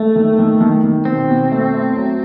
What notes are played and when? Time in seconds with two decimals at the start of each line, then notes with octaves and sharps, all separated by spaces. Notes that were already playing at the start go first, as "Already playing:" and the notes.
Already playing: A3
0.16 D#3
0.39 D#3
0.61 D#3
0.84 D#3
1.05 B2 C4
1.28 B2
1.52 A3
1.74 E4
1.96 F#3